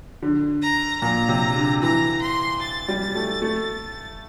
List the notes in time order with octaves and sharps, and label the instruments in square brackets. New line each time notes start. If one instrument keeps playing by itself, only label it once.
[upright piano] D3
[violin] A#5
[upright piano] A#2 [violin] A#5
[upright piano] C3
D3
[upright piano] E3 [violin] A#5
[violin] C6
A6
[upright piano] G3
A3
A3